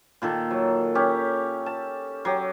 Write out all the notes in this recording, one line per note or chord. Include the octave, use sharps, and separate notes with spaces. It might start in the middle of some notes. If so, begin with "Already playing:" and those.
A#2 D#3 A4
F#3
C#4 G4
A5
F#3 G4